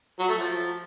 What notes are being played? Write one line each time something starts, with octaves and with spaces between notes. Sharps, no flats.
F#3
A3
F3